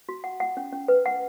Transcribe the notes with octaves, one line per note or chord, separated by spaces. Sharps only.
F#4
F#5
F#5
C#4
C#4
B4
F#5